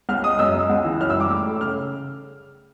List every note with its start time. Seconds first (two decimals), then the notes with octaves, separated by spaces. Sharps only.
0.09 C#2 F6
0.24 G#3 D#6
0.39 F#2 E6
0.54 G#3
0.70 C#2
0.85 E3
1.00 F#2 F6
1.10 E6
1.16 G3 D6
1.30 A2
1.46 A3
1.61 C#3 F6